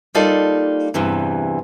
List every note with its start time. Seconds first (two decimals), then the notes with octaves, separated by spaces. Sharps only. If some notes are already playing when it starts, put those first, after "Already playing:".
0.15 G3 A#3 D#4 F4 A4 D5
0.94 E2 G2 C3 E3